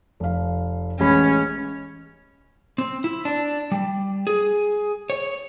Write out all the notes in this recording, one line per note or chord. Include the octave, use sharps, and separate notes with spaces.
F1 F5
A1 G#3 C#4 B5
C4
E4
D4
G3
G#4
C#5